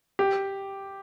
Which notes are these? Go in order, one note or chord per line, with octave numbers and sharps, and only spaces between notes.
G4